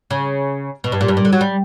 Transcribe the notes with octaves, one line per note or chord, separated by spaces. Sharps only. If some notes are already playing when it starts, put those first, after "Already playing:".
C#3
B2
G2
A#2
G2
A#2
D3
F#3
G3